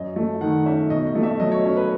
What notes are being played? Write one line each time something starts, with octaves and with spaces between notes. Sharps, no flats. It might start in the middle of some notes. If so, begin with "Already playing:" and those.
Already playing: F#2 D#5
A3
D#3 F#5
C#4 E5
B2 D#5
D#5
A3
E5
F#3 D#5
C#5
C#4
B4